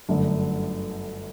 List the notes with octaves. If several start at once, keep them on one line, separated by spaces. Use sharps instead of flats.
G1 F#2 D3 A3 D4